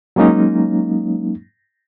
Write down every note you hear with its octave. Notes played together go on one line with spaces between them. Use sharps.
F#3 G#3 A#3 C#4 D#4